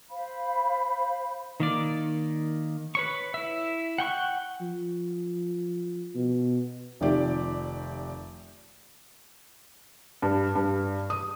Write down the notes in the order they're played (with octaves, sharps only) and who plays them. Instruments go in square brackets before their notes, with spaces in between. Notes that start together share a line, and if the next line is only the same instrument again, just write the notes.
[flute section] C5 F5 B5
[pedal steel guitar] D#3 A#3 D5
B4 C#5 C#6
E4 E5
F#5 G5 C#6 F#6
[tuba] F3
B2
[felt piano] F1 C3 D#3 F3 G4 D5
G2
G2
D#6